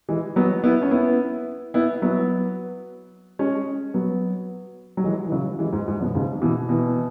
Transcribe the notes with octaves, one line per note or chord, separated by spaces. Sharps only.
E3 G#3
F#3 B3
B3 E4
C#4
B3 E4
B3 E4
F#3 B3
G#3 C#4
F#3 B3
F#3
E3 G#3
E3
C#3 F#3
E3 G#3
G#2
G#2
F#2 B2
G#2 C#3
B2 E3
B2 E3